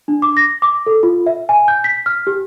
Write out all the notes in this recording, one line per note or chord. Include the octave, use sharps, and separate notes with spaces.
D4
D6
A#6
D6
A4
F4
E5
G#5
G6
B6
F6
G4